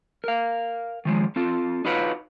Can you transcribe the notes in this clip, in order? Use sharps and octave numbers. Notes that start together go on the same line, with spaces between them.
A#4 F5
D#3 F3 G#3
C4 F4 A4
D#4 F4 F#4 B4 C#5 F5